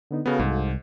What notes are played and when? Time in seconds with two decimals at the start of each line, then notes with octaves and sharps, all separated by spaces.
0.11 D3 B3 D#4
0.26 C#3 B3 F#4 A4 F5
0.39 C2 G#2